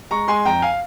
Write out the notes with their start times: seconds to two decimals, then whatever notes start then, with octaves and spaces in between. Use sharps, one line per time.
0.11 G#3 A#5 C#6
0.28 G#3 G#5 C6
0.45 F2 G5 A#5
0.62 F5 G#5